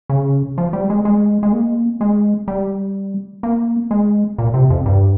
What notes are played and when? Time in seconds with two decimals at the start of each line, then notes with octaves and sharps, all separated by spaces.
0.10 C#3
0.58 F3
0.73 G3
0.90 G#3
1.05 G#3
1.43 G#3
1.53 A#3
2.01 G#3
2.48 G3
3.43 A#3
3.91 G#3
4.38 A#2
4.54 C3
4.70 F2
4.86 G2